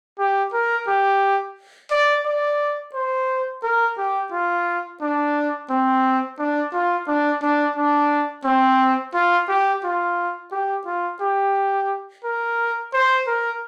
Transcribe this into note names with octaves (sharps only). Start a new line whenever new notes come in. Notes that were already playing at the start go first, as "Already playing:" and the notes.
G4
A#4
G4
D5
D5
C5
A#4
G4
F4
D4
C4
D4
F4
D4
D4
D4
C4
F4
G4
F4
G4
F4
G4
A#4
C5
A#4